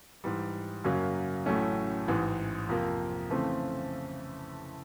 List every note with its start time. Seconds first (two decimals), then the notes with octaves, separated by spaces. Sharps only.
0.24 G#2 E3 G3
0.84 F#2 C#3 F#3 A#3 C#4
1.46 A1 A2 F#3 A3 C#4
2.08 A1 G#2 E3
2.69 F2 C3 F3 A#3
3.30 F2 C#3 E3 A3 C4